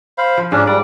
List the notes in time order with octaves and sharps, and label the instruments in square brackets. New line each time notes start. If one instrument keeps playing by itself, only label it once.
[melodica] C5 F5 B5
[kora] F3
[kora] G#2 [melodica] C#4 D4
[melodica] G3 [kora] D5